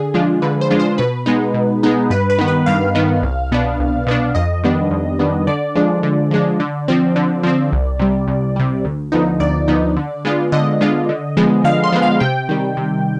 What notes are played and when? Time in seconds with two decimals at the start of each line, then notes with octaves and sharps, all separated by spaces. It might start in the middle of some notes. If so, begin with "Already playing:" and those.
Already playing: D3 G#4
0.14 F3 G#3 D4 F4
0.42 D3 B4
0.61 C5
0.70 F3 G#3 D4 F4
0.80 C5
0.98 B2 B4
1.26 G#3 B3 D#4
1.54 B2
1.83 G#3 B3 D#4
2.10 G2 B4
2.30 B4
2.39 D#3 B3
2.48 B4
2.66 G2 F5
2.95 D#3 B3
3.22 C2
3.52 B2 B3 D4
3.80 C2
4.07 B2 B3 D4
4.35 F2 D#5
4.63 D#3 G3 B3 D4
4.91 F2
5.19 D#3 G3 B3 D4
5.47 D3 D5
5.75 F3 G#3 D4
6.03 D3
6.31 F3 G#3 D4
6.60 D3
6.88 F3 C4
7.16 D3
7.43 F3 C4
7.72 C2
7.99 C3 G3
8.28 C2
8.56 C3 G3
8.85 D2
9.12 D3 F3 B3 D#4
9.40 D2 D5
9.68 D3 F3 B3 D#4
9.97 D3
10.25 G#3 B3 D4 F4
10.52 D3 D#5
10.81 G#3 B3 D4 F4
11.09 D3
11.37 F3 G#3 B3
11.64 D3 F5
11.84 C6
11.92 F3 G#3 B3
12.02 F5
12.20 C3 G5
12.49 D#3 G3
12.77 C3